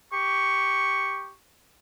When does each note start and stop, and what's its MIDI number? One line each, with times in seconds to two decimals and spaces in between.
0.12 1.32 67
0.12 1.32 85